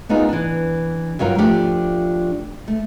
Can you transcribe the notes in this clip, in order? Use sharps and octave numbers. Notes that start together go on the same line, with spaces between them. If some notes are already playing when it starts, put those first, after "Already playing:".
B3 D4 D#4 F4 G#4 A#4
E3 D4
G2 F#3 F4 A#4
F3 A3 D4 F4 G4
A3